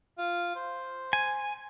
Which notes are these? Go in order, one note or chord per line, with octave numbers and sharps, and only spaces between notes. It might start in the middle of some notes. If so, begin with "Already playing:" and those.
F4
C5
G#5